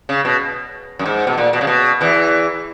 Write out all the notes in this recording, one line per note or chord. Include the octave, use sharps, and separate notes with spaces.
C#3
B2
F#2
G#2
B2
A#2
B2
C#3
B2
E2 E3